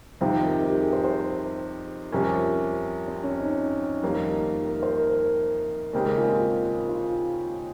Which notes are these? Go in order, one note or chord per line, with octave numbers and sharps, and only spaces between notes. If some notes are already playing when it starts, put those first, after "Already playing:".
F2 C3 D#3 G3 C4 F5
G5
A#4
G4
G#4
C5
C5
F2 C3 G3 C#4 A#4
C4
C#4
D#4
F2 D#3 G3 A#3 F4
A#4
C5
A#4
D#2 C#3 G#3 C4 G4 A#4
G#4
F4
F4
F4